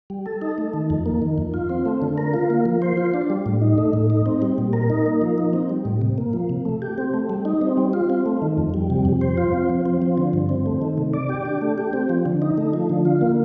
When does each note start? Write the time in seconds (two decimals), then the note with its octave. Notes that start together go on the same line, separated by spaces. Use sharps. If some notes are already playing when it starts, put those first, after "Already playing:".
0.10 G3
0.26 A4
0.42 D#4
0.58 A3
0.73 D#3
0.90 F2
1.06 A#3
1.22 D#3
1.38 F2
1.54 F4
1.69 C4
1.85 A3
2.02 D3
2.18 A#4
2.34 F4
2.50 A#3
2.65 F3
2.82 C5
2.97 F4
3.14 D4
3.30 G3
3.46 A2
3.62 D#4
3.78 A3
3.93 A2
4.10 D#4
4.26 C4
4.42 G3
4.58 A#2
4.73 A#4
4.90 D#4
5.06 A#3
5.22 F3
5.38 D#4
5.53 C4
5.70 G3
5.85 A2
6.01 C3
6.18 A#3
6.33 F3
6.49 C3
6.65 A3
6.82 G4
6.98 C4
7.14 A3
7.30 G3
7.45 D#4
7.61 C4
7.77 G3
7.93 F4
8.10 C4
8.26 A3
8.42 D#3
8.58 F2
8.74 G3
8.90 C3
9.05 F2
9.21 C5
9.37 F4
9.54 C4
9.69 F3
9.86 C4
10.02 F3
10.18 D3
10.33 G2
10.49 C4
10.66 A3
10.82 D#3
10.98 C3
11.14 D5
11.29 G4
11.45 D4
11.61 A3
11.78 G4
11.93 C4
12.09 F3
12.26 D3
12.42 D#4
12.58 A3
12.73 F3
12.90 D3
13.05 F4
13.21 A#3